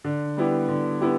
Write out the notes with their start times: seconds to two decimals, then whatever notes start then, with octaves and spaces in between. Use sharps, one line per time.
0.04 D3
0.37 G3 B3 E4 G4
0.69 D3
1.01 B3 E4 G4